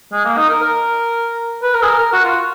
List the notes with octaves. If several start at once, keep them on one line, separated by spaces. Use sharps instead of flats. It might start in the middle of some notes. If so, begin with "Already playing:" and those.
G#3
A#3
D#4
A#4
A#4
B4
A#4
G#4
A#4
A#4
F#4
F4